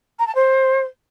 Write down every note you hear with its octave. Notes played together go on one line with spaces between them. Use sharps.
A#5
A5
C5